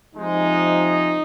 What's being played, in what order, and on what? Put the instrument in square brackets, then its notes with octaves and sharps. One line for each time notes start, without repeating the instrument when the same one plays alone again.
[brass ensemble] C3 F3 G#3 D#4